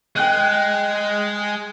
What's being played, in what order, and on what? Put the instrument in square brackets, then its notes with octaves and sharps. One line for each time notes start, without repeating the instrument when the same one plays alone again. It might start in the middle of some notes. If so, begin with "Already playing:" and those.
[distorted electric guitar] G#3 [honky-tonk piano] G5 F#6 D#7